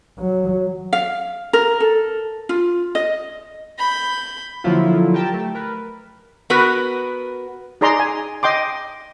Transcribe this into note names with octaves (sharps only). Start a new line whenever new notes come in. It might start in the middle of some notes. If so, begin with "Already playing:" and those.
F#3
F5
A#4
A4
F4
D#5
B5 G6
D3 F3 F#3 A#3 E4 F4
G4 A#4 G5 A5
A3
A#4 B4
B3 F#4 A#4 B4
D#4 G#4 D5 A#5 C6
G#5
D#5 G5 C6 D6